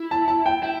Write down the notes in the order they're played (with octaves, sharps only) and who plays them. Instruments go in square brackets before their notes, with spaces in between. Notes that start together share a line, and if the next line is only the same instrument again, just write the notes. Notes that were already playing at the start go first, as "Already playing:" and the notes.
Already playing: [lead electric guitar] E4
[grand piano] A5
A5
G5
[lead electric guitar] E4 [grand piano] G5